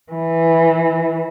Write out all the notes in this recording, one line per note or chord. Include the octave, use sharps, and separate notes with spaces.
E3